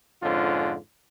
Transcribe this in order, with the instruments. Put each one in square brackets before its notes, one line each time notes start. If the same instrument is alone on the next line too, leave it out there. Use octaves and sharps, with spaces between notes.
[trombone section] F2 G#2 D3 C#4 F4